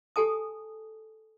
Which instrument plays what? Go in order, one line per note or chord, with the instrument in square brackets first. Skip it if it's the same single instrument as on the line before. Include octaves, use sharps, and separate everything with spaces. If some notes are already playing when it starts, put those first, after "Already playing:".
[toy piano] G4 A4 G#5 A5 D#6